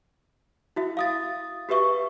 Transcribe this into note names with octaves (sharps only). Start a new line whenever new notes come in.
E4 F#4 E5
F5 D#6 A6
F#4 G4 B4 E5 C#6